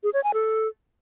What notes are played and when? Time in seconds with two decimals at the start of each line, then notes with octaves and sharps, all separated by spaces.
0.03 G#4
0.14 C#5
0.24 G#5
0.34 A4